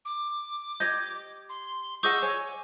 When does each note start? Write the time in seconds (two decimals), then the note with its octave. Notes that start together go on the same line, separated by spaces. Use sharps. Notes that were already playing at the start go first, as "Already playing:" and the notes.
0.05 D6
0.80 G4 D#5 G6 G#6
1.49 C6
2.03 G#4 D#5 F#5 C#6 D6 E6 G6
2.22 C#5 G#5